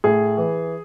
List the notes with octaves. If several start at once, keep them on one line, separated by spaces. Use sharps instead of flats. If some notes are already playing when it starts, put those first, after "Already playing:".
A2 G#4
E3